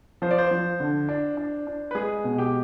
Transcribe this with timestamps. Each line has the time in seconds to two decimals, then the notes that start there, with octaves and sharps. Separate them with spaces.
0.22 F3 C5
0.31 D5
0.38 C5
0.51 F3
0.80 D3
1.09 D4
1.37 D4
1.67 D4
1.91 B4
1.95 G#3 G#4
2.24 B2
2.38 G4